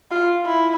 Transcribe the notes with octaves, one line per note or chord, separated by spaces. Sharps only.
F4
E4